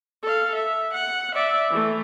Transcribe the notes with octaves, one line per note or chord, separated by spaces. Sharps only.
A4 F5
E5
F#5
D5 E5
E3 A3